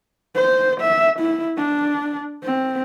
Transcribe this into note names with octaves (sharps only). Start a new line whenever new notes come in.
C5
E5
E4
D4
C4